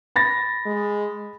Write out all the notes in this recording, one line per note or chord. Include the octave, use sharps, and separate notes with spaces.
B5 A6 A#6
G#3